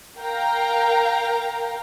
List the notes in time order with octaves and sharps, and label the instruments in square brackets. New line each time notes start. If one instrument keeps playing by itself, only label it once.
[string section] A#4 F5 G5 A#5